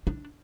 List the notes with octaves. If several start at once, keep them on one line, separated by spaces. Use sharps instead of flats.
D4